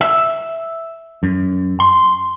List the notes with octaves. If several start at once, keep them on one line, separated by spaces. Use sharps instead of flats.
E5
F#2
C6